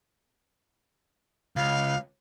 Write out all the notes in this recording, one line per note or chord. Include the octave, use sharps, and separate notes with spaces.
C#2 F5